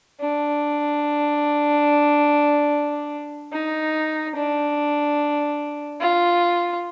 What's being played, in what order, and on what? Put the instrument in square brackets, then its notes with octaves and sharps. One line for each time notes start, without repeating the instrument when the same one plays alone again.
[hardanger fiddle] D4
D#4
D4
F4